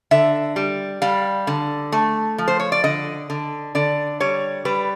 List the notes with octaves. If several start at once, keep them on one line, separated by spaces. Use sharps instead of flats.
D3 E5
G3
G3 F5
D3
A3
F3
C5
C#5
D5
D3 D#5
D3
D3 D5
G3 C#5
G3 B4